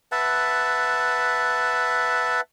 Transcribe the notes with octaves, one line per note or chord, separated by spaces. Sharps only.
B4 E5 F#5 A5